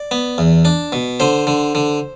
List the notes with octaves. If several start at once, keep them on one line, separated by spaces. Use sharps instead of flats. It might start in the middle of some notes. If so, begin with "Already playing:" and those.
Already playing: D5
B3
E2
D4
B2
D3 C5
D3
D3